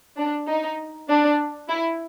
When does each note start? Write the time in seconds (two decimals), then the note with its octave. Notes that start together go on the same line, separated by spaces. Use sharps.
0.18 D4
0.49 D#4
1.09 D4
1.70 E4